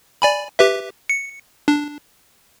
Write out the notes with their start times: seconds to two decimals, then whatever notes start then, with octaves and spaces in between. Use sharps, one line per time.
0.22 D5 G#5 B5
0.59 G4 B4 E5
1.09 C#7
1.68 D4